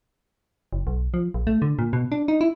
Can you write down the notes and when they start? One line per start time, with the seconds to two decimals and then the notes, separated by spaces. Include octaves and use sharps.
0.73 F#1
0.87 B1
1.14 F3
1.34 A#1
1.47 A3
1.62 D3
1.79 A#2
1.93 B2
2.12 D4
2.28 D#4
2.41 E4